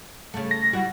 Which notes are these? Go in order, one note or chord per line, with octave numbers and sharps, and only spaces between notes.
C#3 A3
A#6
G3 E4 F#4